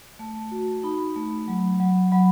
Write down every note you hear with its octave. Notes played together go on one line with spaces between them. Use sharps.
A3 A5
F#4
D#4 B5
A3
F#3
F#3
F#3 B5